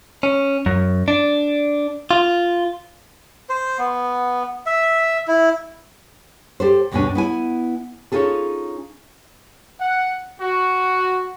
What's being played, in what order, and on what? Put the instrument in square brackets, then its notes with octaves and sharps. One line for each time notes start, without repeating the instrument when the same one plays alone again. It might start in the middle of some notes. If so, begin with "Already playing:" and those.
[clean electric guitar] C#4
F#2
D4
F4
[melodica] C5
B3
E5
E4
[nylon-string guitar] G4 A4 C5
D2 G2 B2 C#4 D4 G#5
B3 E4 G#5
C#4 D#4 F4 G#4 A4
[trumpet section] F#5
F#4